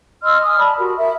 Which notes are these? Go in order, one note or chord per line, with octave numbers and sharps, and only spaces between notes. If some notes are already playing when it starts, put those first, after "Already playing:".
D#5 C6 E6 F6
G#5 D#6 F6
D5 A5 B5
F#4 G4 A#4
A#4 E5